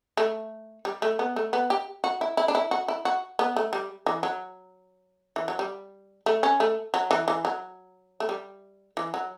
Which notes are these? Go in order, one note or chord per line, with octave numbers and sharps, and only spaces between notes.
A3
G3
A3
B3
A3
B3
G4
F#4
E4
E4
D4
E4
F#4
E4
F#4
B3
A3
G3
E3
F#3
E3
F#3
G3
A3
C#4
A3
F#3
E3
E3
F#3
A3
G3
E3
F#3